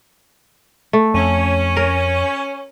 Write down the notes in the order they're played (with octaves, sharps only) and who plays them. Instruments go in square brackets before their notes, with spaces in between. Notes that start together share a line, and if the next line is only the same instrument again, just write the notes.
[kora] A3
[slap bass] F2 [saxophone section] C#4
[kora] A#4